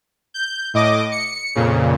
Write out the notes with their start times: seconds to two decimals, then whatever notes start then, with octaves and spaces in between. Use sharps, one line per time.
0.34 G6
0.74 A2 D#5 D6
1.12 C#7
1.55 F2 A#2 C#3